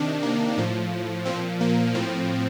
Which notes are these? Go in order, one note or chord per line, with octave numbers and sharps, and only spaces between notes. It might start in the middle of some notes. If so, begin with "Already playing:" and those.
Already playing: C3 D#3 D4
A#3
A2 F3
A#2 F3 C4
A#3
A2 F3 C4